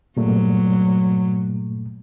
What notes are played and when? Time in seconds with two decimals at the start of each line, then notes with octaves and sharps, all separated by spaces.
0.17 G2 A#2 F#3 A3